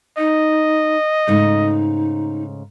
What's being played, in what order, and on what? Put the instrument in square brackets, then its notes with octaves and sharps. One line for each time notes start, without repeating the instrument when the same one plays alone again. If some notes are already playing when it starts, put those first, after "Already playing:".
[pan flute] D#4 [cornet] D#5
[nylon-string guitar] G#2 C#3 A3 [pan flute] D#4